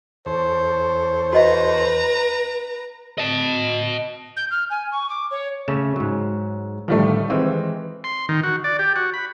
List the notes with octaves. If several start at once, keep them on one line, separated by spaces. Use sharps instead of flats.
E2 A4 C5 C#5
F#4 B4 D#5 F5 A#5
D#5 A5
G6
F6
G#5
C#6
D6
C#5
C#3 A3 C#4 E7
G#2 F#3
A2 D3 D#3 F3 G3 A3
D#3 E3 G#3 C4
C6
D#3
F#4
D5
G4
F#4
B5